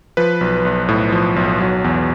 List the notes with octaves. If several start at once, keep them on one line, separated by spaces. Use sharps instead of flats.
F3 B4
B1
B1
A2
F3
B1
F#3
E2